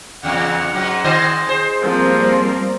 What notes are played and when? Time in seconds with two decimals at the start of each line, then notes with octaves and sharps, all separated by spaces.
0.23 E2 C#3 F#5
0.73 G#2 F#3
1.04 D#3 C5 D#5
1.47 G#4 C5
1.82 F3 G3 A#3 C4